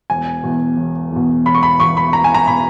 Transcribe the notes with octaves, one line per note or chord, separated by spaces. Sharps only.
E1 G#5
E2 B2
E1
E2 B2
E1 B5
C#6
B5
E2 B2 C#6
B5
E1 A#5
G#5
A#5
B2 B5